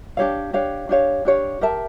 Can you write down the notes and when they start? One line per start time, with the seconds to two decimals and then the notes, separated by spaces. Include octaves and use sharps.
0.17 D4 G4 C#5 F5
0.53 D4 G4 C#5 F5
0.89 D4 G4 C#5 F5
1.25 D4 G4 C#5 F5
1.61 G4 A#4 E5 A5